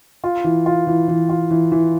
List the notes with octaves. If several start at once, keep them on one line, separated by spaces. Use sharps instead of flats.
F4
E3
F4
E3
E3
F4
E3
E3